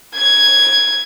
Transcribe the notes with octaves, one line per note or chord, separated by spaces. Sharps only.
G#6